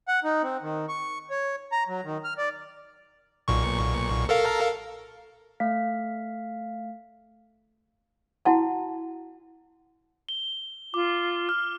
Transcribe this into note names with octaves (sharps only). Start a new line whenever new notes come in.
F#5
D#4
C4
D#3
C#6
C#5
A#5
F#3
D#3
F6
D5
B1 A#2 C#6
A4 A#4 F5
A3 F5 B6
E4 F#4 F#5 A5
G7
F4 D6
F6